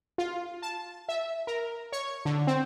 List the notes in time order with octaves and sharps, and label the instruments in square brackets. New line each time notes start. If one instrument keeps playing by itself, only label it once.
[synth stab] F4
A5
E5
A#4
C#5
D3
C4